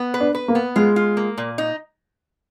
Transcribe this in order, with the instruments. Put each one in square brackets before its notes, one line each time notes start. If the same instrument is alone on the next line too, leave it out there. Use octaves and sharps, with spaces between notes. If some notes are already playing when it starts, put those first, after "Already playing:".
Already playing: [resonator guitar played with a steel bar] B3
B4
[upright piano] D4
[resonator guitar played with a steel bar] B4
[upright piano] A#3
[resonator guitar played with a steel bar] B3
[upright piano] G#3 [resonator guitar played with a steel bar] F4
[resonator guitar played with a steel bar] F4
A#3
A#2
D#4